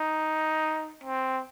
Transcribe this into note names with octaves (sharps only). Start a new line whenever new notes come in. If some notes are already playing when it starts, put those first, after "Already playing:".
Already playing: D#4
C4